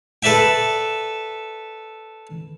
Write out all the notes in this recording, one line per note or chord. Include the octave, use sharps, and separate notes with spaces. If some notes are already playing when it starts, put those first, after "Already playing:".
A4 B4 D5 E5 G5